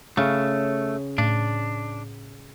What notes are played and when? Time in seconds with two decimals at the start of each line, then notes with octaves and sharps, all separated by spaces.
0.17 C#3 A3 C#5
1.18 A2 D4